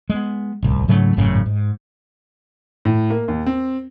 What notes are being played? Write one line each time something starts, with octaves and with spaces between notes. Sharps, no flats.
G#3 B3
D1 C2
G#2 C#3 F#3 A3
G#1 F#2 A2 C#3
G#2
A2
A#3
D#2
C4